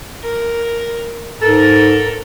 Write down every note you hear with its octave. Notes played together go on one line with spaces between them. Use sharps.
A#4
G#2 A4 A#4